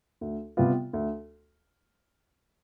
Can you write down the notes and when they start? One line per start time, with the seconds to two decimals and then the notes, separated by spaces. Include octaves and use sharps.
0.21 D2
0.57 C3 G3 B3 F4
0.93 D2